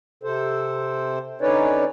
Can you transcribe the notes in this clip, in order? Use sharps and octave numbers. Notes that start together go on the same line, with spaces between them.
C3 A4 C5
D3 C#4 D#4 B4 C#5 D5